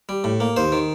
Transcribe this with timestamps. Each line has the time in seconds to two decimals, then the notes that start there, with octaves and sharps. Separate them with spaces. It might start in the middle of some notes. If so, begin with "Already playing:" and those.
0.09 G3
0.24 A2
0.40 A#3
0.57 D#2 C5
0.72 D#3